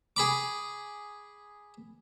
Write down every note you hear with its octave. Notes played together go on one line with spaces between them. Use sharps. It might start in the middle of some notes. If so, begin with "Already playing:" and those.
G#4 B5 D6